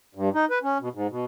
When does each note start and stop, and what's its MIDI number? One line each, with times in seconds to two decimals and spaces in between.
0.15 0.29 43
0.34 0.45 63
0.50 0.59 71
0.63 0.78 61
0.80 0.89 47
0.94 1.07 44
1.10 1.25 47